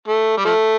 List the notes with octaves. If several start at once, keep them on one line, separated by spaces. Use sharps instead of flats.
A3
G3
F3 A3